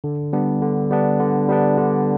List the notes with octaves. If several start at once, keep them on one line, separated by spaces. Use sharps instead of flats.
D3
G3 B3 D4
D3
G3 B3 D4
D3
G3 B3 D4
D3